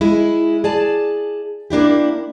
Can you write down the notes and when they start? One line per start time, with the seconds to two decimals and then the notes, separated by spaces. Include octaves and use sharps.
0.01 G#3 E4
0.64 G#4 D5 A5
1.70 A#3 D4 E4 G4